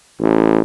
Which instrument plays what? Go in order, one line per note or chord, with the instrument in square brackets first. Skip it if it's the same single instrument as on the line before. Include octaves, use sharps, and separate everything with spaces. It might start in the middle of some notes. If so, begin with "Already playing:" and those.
[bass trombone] A1